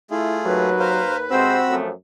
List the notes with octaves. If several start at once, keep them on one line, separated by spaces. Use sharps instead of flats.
A3 E4 F4 G#4
D#2 F#3 B4
A#4 C5 F5
C3 G#3 C4 F#4 C5 B5 E6
F#2 F3 A3